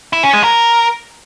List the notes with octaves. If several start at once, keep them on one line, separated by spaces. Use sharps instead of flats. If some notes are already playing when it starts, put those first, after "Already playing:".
E4
C#4
G#3
A#4